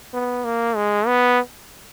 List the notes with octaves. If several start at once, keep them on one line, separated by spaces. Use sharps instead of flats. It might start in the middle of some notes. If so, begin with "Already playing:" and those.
B3
A#3
G#3
B3